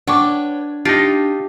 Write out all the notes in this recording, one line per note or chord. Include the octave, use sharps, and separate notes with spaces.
D4 B4 C#5 F#5 G5 C#6 D6
D4 D#4 F4 G4 D7